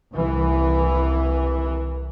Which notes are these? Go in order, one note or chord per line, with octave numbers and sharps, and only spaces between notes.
C2 E3